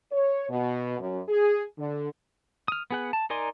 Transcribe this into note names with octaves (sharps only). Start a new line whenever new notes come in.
C#5
B2
F#2
G#4
D3
D#6 F6
B3 G#4 F#5
A5
D#4 A#4 D5 G#5 C6